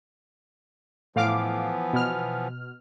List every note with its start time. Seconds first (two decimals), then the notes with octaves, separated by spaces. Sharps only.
1.16 A2 E3 F3 B3 F5 D6
1.93 B2 F6